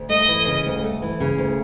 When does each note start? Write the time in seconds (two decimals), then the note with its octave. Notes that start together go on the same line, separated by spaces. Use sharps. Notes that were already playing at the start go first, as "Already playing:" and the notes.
Already playing: D2
0.09 A3 D#5
0.28 E3
0.47 C#3
0.66 D2
0.84 A3
1.02 E3
1.20 C#3
1.38 D2